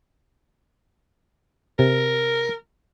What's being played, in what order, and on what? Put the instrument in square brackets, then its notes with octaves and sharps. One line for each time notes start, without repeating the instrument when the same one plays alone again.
[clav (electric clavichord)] C3 [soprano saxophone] A#4